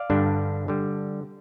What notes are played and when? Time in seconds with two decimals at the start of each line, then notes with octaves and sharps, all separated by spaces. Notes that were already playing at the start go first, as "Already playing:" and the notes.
Already playing: D5 F5
0.10 G2 D3 G3 D4
0.68 D3 G3